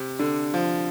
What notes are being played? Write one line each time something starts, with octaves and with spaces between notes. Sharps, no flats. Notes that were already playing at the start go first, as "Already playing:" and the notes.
Already playing: C3
D3
F3